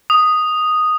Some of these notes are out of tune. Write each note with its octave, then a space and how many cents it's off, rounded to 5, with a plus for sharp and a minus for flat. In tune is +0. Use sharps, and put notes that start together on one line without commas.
D#6 -5